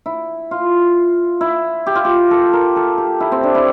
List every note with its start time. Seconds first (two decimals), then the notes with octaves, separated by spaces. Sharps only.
0.06 E4
0.51 F4
1.41 E4
1.86 G4
1.95 F4
2.05 G4
2.31 A4
2.53 A#4
2.76 A4
2.98 G4
3.20 E4
3.32 C4
3.43 D4
3.55 E4